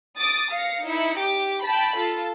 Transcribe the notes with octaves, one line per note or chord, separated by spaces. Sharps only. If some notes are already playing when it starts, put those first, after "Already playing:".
D6 D#6 A6
F5 A#6 C#7
D#4 E4 C#7
G4 D6
G5 A5 B5
F4 A4